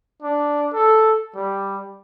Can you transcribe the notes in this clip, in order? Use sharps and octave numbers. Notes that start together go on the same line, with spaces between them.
D4
A4
G3